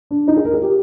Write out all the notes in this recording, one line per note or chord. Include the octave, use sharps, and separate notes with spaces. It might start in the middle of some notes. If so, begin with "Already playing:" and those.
D4
D#4
G#4
A#4
G#4
G4